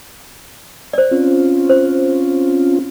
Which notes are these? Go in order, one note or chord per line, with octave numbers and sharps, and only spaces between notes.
C5 D5
C4 C#4 F4
C5